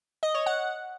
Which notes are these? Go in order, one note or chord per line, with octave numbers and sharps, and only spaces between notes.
D#5
C#5
F#5